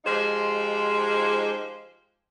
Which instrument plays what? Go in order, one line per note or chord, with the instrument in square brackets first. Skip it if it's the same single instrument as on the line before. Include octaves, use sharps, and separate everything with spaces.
[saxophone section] F3 G#3 D#4 F4 G4 C5